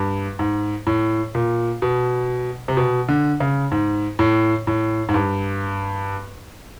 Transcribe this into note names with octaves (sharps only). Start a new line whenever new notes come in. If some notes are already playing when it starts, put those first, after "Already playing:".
Already playing: G2
G#2
A2
A#2
B2
C3
B2
D3
C#3
G#2
A2
A2
G#2
G2